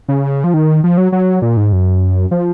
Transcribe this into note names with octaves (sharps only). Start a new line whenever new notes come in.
C#3
F3
D#3
F3
F#3
F#3
A#2
G#2
F#2
F3